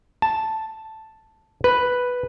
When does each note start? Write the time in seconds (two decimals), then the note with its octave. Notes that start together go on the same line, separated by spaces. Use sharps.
0.22 A5
1.64 B4